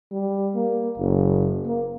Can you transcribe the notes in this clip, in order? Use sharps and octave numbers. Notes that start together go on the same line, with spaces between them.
G3
A#3
F#1
A#3